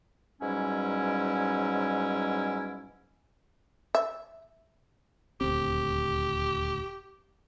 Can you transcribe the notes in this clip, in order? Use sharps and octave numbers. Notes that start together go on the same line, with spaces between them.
G#2 B2 F#3 G3 C#4 E4
E5
D#1 D2 C4 G4